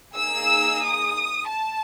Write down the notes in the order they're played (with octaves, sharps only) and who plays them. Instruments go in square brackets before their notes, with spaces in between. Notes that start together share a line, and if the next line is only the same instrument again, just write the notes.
[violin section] A#3 D#4 G#4 E6
D#6
A5